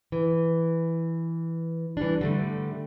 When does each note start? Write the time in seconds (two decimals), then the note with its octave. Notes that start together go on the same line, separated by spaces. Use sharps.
0.12 E3
1.97 E3 G3 D4
2.21 D3 G3 A3